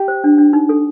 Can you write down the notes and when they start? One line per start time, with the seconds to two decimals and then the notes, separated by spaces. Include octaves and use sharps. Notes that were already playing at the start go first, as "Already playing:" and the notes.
Already playing: G4
0.08 C5
0.24 D4
0.38 D4
0.53 D#4
0.69 A4